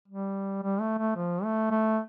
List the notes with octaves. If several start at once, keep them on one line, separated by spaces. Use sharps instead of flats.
G3
G3
A3
A3
F3
A3
A3